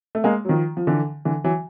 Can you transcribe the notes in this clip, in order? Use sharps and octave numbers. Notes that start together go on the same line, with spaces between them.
A3
G#3 A#3
F#3
D#3 F3
F3
D3 E3
D3 E3
E3 F#3